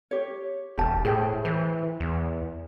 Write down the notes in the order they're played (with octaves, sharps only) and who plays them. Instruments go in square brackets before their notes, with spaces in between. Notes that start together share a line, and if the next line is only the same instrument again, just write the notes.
[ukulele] G4 C#5
[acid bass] E1 [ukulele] G4 A5
[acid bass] A2 [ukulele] G#4 C5 G5
[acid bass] E3 [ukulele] C5
[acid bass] E2